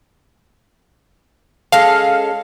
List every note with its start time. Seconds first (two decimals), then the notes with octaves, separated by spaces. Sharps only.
1.72 G#3 C#4 A4 F5